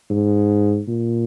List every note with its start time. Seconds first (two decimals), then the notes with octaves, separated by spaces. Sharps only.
0.10 G#2
0.88 A#2